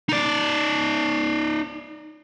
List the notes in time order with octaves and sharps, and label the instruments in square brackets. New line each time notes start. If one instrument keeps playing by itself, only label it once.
[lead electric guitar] D#4 D5